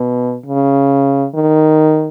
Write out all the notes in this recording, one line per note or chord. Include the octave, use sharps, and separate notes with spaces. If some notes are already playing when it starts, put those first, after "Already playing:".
Already playing: B2
C#3
D#3